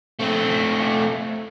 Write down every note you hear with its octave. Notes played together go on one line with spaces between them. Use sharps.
A3 C4